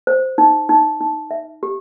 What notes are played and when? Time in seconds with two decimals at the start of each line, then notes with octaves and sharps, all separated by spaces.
0.07 C5
0.38 D#4
0.69 D#4
1.01 D#4
1.31 E5
1.63 G4